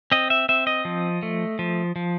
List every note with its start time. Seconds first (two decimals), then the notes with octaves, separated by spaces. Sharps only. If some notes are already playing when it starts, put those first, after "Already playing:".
0.12 C4 D#5
0.30 E5
0.49 C4 E5
0.67 D#5
0.85 F3
1.23 A3
1.59 F3
1.96 F3